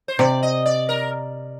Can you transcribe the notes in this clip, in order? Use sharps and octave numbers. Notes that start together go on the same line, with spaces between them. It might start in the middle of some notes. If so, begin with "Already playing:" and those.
C5
C3 D5
D#5
D5
A#4